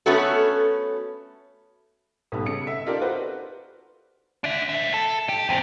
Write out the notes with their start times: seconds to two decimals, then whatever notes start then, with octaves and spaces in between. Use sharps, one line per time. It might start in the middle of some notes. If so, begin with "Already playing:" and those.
0.06 A3 B3 C#4 F#4 A4
2.32 B1 G3 A3 B3
2.46 C#3 C#7
2.67 E5
2.86 D#4 F4 G4 A4 A#4 D5
3.01 F#4 B4 C5
4.44 D4 E5
4.69 D#2 E5
4.94 A4
5.29 G4
5.49 E2 C4